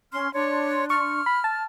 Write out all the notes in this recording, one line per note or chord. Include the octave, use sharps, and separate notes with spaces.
C#4 C6 F6
D4 C#5 C6
C#6 F6
B5
A5